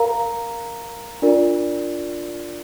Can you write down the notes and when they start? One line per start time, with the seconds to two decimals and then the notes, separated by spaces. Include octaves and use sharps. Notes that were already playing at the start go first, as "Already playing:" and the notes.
Already playing: A#4 F5 A#5
1.22 D4 F4 A#4 D5